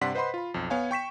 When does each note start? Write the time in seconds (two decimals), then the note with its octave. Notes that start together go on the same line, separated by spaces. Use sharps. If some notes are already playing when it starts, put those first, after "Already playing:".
0.01 G2 C3 D5 F#5 C6 B6
0.15 B4 C5 D#5 F#5 B5 C6
0.34 F4 B5
0.54 B1 F2
0.70 B3 C#5 F5 G#5
0.91 G5 C#6 B6 E7